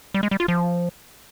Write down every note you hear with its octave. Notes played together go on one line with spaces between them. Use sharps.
G3
G#3
G3
F4
F3